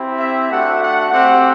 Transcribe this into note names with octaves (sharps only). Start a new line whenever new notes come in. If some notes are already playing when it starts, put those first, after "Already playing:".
Already playing: C4 E4 G4
E5
A3 D4 F#4 F#5
F#5
A3 C4 G4 F#5